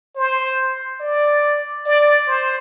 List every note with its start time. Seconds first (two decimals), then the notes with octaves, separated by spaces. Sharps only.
0.16 C5
1.00 D5
1.86 D5
2.27 C5